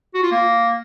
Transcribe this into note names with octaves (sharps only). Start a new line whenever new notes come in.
F#4
F4
A#3